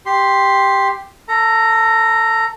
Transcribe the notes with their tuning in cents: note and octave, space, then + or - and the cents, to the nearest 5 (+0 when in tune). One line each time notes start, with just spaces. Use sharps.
G4 +5 C6 +0
A4 +20 A#5 -5